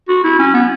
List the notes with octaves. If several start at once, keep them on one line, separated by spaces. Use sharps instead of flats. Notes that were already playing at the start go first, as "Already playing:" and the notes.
F#4
E4
C#4
B3